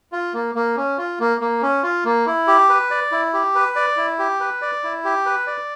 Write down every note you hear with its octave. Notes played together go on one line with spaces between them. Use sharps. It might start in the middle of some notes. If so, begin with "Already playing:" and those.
F4
A#3
A#3
C#4
F4
A#3
A#3
C#4
F4
A#3
E4
G4
B4
D5
E4
G4
B4
D5
E4
G4
B4
D5
E4
G4
B4
D5